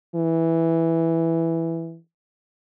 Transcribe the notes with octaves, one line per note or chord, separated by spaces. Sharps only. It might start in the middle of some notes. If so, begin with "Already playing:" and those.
E3